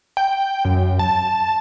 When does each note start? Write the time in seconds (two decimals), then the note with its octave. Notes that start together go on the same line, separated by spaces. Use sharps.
0.17 G5
0.65 F#2
0.99 A5